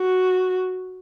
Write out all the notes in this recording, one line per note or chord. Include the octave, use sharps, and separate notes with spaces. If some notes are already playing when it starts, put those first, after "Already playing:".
Already playing: F#4